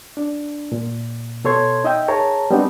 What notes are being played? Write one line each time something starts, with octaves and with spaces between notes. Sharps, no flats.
D4
A#2
B2 A4 C#5 C6 G#6
D#4 D#5 E5 G5
G#4 A#4 C#5 A5 A#5
G3 B3 C4 D4 D#4